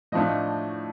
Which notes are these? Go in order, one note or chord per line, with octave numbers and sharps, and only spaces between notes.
A2 F3 A3 D4 D#5